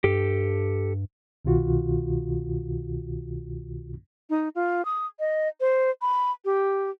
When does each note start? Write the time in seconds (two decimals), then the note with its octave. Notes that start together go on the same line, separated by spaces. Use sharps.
0.04 G2 G4 A4
1.45 C2 B2 D#3 F4 F#4
4.30 D#4
4.55 F4
4.85 D#6
5.20 D#5
5.60 C5
6.02 B5
6.45 G4